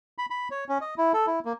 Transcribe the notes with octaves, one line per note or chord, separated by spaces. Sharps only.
B5
B5
C#5
C#4
D#5
E4
A4
E4
A#3